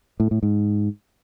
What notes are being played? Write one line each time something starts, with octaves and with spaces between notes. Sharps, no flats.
A2
A2
G#2